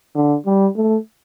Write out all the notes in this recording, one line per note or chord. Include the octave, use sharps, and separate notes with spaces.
D3
G3
A3